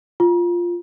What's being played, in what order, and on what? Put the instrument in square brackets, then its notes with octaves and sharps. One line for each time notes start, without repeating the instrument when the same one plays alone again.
[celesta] F4